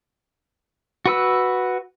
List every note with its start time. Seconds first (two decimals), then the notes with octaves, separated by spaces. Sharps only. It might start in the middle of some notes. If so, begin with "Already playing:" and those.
1.06 F#4 B4 E6